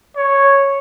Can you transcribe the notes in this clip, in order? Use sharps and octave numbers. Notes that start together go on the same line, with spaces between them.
C#5